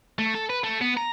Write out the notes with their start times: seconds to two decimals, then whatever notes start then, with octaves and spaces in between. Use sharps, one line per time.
0.19 A3
0.35 A4
0.49 B4
0.64 A3
0.81 B3
0.97 A#5